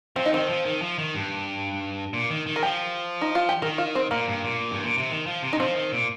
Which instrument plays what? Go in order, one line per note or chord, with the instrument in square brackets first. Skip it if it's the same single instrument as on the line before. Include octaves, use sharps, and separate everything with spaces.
[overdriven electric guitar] F3 [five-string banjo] C4
[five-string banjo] D#4
[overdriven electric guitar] D#3 [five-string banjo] C4
[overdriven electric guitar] F3
D#3
F3
D#3
G2
A#2
D#3
D#3
[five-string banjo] A#4
[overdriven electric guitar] F3 [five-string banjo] G4
[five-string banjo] D#4
F4
G4
[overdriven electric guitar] D#3 [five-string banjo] A#4
[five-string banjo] F4
C4
[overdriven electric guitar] A#2 [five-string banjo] A#3
[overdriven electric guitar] G2
A#2
G2
A#2
C3
D#3
F3
C3
[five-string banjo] D#4
[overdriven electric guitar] F3 [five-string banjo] C4
[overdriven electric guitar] D#3
A#2